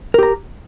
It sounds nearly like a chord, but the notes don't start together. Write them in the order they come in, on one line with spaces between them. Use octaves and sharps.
A#4 G4 A#5